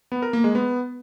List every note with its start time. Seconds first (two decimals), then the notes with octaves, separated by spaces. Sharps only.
0.12 B3
0.22 A#4
0.33 A#3
0.44 G#3
0.55 B3